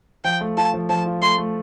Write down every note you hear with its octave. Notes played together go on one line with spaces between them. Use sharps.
F3 G5
A3
F4 A5
F3
F3 A5
F4
A3 C6
A3